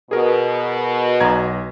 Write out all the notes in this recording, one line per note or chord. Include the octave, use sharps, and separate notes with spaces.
B2 G#4 A#4
B1 A#5 G#6